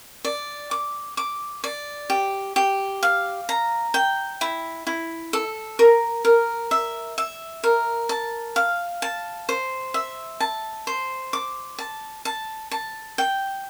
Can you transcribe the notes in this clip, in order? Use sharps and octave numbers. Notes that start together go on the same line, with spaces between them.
D5
D6
D6
D5
G4
G4
F5
A#5
G5
E4
E4
A4
A#4
A#4
E5
E5
A#4
A5
F5
A5
C5
E5
A5
C5
D6
A5
A5
A5
G5